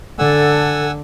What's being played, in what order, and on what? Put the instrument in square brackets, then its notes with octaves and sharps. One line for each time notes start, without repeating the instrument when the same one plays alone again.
[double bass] D3 [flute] A4 [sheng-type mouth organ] F#5 G#5 E6